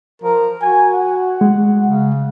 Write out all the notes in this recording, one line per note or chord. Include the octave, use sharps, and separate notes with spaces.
F3 A#4
F#4 G#5
F#5
G#3
C#3